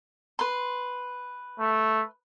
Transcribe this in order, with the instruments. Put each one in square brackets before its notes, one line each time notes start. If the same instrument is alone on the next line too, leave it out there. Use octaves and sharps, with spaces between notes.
[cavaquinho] B4 C6
[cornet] A3